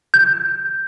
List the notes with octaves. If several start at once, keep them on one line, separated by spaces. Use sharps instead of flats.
G6